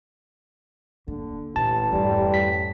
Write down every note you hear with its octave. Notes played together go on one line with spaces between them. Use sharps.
D3 A#3
A1 A#2 A5
F2 G#2 G3
B6